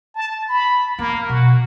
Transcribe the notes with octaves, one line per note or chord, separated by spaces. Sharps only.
A5
B5
A#3 B3
B2 F#4